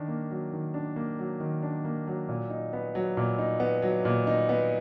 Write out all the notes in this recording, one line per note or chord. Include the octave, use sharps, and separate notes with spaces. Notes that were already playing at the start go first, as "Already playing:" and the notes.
Already playing: D#3 D4
A#3
F#3
D#3
D4
A#3
F#3
D#3
D4
A#3
F#3
A#2
D#4
B3
F#3
A#2
D#4
B3
F#3
A#2
D#4
B3